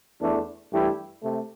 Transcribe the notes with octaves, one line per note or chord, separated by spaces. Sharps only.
E2 E3 A3 D4 A4
G2 E3 A3 E4 G4
C3 A3